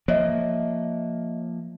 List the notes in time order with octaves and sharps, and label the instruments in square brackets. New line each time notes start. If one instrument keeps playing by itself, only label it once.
[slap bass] F3 A#3 [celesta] C#5 D#5 E5